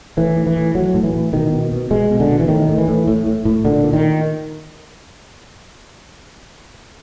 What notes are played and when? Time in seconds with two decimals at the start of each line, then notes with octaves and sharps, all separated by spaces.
0.17 A2 E3
0.36 A2
0.47 E3
0.56 A2
0.75 A2 F#3
0.94 A2
1.04 E3
1.13 A2
1.33 B2 D#3
1.52 B2
1.72 B2
1.91 B2 G#3
2.11 B2
2.20 D3
2.30 B2
2.39 E3
2.48 A2 D#3
2.69 A2
2.78 E3
2.88 A2
3.07 A2
3.27 A2
3.45 A2
3.64 A#2 D3
3.84 A#2
3.93 D#3